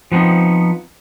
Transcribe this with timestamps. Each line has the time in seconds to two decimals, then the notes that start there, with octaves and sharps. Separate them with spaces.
0.12 F3 B3 C4 D4 D#4